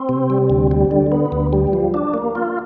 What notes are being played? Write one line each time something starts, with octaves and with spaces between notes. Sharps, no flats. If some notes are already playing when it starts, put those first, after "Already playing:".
Already playing: C4
C3
G3
D2
G3
D3
B3
D2
G3
F3
D4
A#3
F4